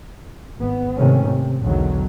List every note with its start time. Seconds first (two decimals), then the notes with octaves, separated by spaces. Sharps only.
0.58 G#1 B3
0.97 G#2 C3 D#3 A3 C#4
1.26 C3
1.63 B1 E2 D3 D#3 F#3